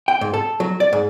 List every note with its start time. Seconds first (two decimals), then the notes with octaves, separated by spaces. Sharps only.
0.08 G5
0.21 G#2
0.34 A4
0.60 F#3
0.80 D5
0.93 G#2